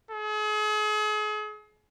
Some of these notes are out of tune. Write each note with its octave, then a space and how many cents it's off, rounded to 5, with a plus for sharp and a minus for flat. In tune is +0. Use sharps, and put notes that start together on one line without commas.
G#4 +40